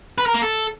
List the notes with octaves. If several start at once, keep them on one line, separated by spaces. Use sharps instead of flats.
B4
A#4
A#3
A4